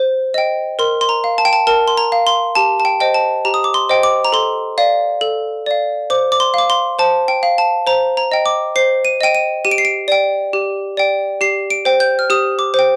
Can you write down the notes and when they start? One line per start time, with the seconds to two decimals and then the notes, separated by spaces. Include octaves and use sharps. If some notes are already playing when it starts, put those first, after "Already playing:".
Already playing: C5
0.34 D#5 G5
0.79 A#4 C6
1.01 C6
1.09 A#5
1.24 F5
1.38 A5
1.45 G5
1.53 A5
1.67 A#4 A5
1.88 C6
1.98 A#5
2.12 F5
2.27 C6
2.55 G4 A5
2.80 A5
2.85 G5
3.00 C5 D#5 G5
3.14 A5
3.45 G4 A#5
3.54 D#6
3.64 D6
3.74 C6
3.89 C5 D#5 G5
4.03 D6
4.25 A#5
4.32 A4 C6
4.78 D5 F5
5.21 A4
5.66 D5 F5
6.10 C5 D6
6.32 D6
6.40 C6
6.54 F5 D6
6.70 C6
6.99 C5 A5
7.28 G5
7.43 F5
7.58 A5
7.87 C5 A#5
8.17 A#5
8.32 D#5 G5
8.46 D6
8.76 C5 C7
9.05 D#7
9.21 D#5 G5 D#7
9.35 D#7
9.65 G4 D#7
9.71 D7
9.78 C7
9.85 D7
10.08 D5 G5
10.53 G4
10.97 D5 G5
11.41 G4 C7
11.70 D7
11.85 C5 G5
12.00 G6
12.19 F6
12.30 G4 D#6
12.59 D6
12.74 C5 G5